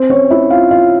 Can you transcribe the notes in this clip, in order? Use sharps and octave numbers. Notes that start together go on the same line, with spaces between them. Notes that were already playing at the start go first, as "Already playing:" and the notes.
Already playing: C4 C5
C#4 C#5
E4 E5
F4 F5
F4 F5